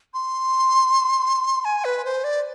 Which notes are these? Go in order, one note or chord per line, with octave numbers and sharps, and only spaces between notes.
C6
G#5
B4
C5
D5